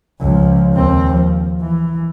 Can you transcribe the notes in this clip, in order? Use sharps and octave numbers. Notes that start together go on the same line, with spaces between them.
C#2 F3
D#2 C4
F3
E3